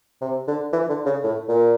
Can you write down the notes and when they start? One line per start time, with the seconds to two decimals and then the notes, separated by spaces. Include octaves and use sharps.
0.21 C3
0.47 D3
0.73 E3
0.89 D3
1.06 C#3
1.24 A2
1.48 A#2